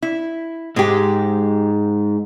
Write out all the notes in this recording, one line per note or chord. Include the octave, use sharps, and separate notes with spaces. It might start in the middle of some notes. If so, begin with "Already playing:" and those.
E4
G#2 G#3 G4